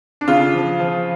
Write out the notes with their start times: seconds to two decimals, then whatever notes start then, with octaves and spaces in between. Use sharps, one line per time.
0.21 D4
0.28 C#3 F4
0.54 F3
0.80 F3